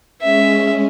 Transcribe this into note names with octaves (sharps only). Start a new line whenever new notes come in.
G#3 C#4 E5